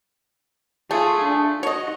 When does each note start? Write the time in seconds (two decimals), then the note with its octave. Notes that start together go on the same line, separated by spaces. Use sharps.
0.91 A3 F4 G#4
1.25 D4
1.63 F#4 C#5 D#5